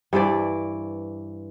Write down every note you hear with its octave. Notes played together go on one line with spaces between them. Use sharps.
G2 E3 C5 D5